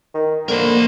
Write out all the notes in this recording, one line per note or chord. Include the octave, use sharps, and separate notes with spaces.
D#3
D3 A#3 A#4 C5